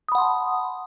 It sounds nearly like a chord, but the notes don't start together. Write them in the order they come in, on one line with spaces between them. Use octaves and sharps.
D#6 B5 F#5 C6 A5